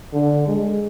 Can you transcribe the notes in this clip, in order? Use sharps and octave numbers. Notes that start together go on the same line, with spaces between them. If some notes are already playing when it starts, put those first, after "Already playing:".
D3
G#3